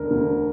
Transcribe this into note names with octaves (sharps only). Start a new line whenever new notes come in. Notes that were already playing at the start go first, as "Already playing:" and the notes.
Already playing: E1 D2 D3 A#4
E1 D2 D3